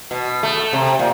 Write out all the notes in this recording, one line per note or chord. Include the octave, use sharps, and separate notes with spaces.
B2
A3
C3
A#2